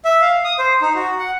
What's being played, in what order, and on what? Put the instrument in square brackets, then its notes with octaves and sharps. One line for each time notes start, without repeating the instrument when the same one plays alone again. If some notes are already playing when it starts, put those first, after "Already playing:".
[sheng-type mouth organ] E5
F5
D#6
C5
D#4
F#4
F#5